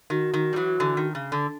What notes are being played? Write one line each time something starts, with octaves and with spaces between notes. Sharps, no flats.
D#3 F#4
D#3
G3
E3 F#3
D3 E3
D#3
C#3
D3